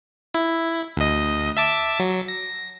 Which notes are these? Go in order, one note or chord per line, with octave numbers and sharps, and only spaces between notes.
E4
D2 D#5
E5 A5 D6
F#3
A#6